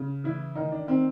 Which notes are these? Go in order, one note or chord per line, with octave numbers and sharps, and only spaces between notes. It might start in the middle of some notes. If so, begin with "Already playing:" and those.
Already playing: C#3
E3 E4
D#3 D#4
D4
D#3 C4